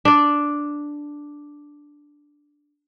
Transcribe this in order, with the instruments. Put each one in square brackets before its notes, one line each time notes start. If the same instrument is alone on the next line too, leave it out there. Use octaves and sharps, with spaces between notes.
[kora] D4 D5